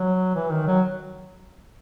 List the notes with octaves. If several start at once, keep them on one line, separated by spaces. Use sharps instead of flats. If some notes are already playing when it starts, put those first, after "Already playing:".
Already playing: F#3
E3
D#3
F#3